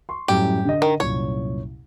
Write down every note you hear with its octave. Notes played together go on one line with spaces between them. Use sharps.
C6 C#6
F#2 A2 G3 G4
D3 D#5
D#3
C2 F#2 A#2 C#5